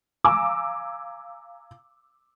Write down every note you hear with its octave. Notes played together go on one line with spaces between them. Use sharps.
F5 G#5 A#5 D6 E6